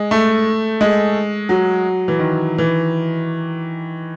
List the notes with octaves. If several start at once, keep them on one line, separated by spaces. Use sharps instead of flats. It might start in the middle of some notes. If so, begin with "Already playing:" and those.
Already playing: G#3
A3
G#3
F#3
E3
D#3
E3